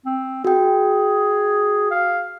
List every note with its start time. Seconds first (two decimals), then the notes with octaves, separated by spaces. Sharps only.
0.06 C4
0.45 F#4 G#4 G5
1.91 F5